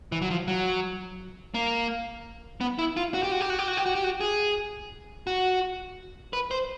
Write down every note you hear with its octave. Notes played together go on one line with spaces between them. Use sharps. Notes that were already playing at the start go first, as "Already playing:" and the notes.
E3
F#3
F3
F#3
A#3
B3
E4
F4
F#4
G4
F#4
G4
F#4
G4
F#4
G4
F#4
G4
F#4
G#4
F#4
B4
C5